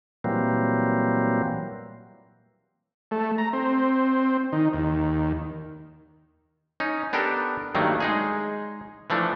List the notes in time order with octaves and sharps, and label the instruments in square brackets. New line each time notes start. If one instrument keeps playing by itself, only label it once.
[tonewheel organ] A#2 E3 F#3 G3 A#3 C4
[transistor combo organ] A3
A#5
C4
D#3
D#2
[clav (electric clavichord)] C#4 D#4
B3 D4 G4 A4 A#4
G2 D#3 F#3 A3 A#3
G#3 D#4 G#4
E3 F3 A3 D4